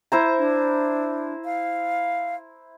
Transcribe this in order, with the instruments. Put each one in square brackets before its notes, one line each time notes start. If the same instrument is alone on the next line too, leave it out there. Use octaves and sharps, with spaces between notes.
[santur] E4 C5 A#5
[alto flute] D4
F5